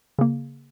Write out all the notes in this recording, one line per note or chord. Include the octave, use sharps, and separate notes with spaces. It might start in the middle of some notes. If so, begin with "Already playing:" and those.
C#3 A#3